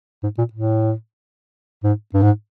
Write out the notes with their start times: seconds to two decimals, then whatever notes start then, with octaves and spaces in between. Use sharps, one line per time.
0.23 G#2
0.38 A#2
0.53 A2
1.84 G#2
2.14 G2
2.22 G#2